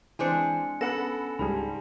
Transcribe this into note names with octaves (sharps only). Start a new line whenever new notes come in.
E3 G#3 C4 D4 G#5 C#7
B3 C#4 A4 F#5 B5 A#6 E7
C#2 G#2 G3 G#4 A5 B5